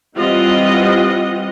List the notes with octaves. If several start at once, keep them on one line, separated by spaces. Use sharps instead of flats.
E3 G3 C4 F4 D#5 F#5